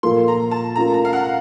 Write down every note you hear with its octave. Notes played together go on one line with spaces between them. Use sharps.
A#2 F3 A#3 F4 A4 C6
A#5
A5
A3 C#4 F4 A#4 A#5
A#5
F5
F#5